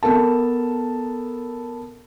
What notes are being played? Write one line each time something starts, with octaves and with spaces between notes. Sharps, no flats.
B3 A4 A#4 A5